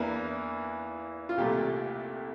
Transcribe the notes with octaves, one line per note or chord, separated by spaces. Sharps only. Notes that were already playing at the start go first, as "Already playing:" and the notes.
Already playing: E2 E3 A#3 D4
F4
C2 A#2 A3 G4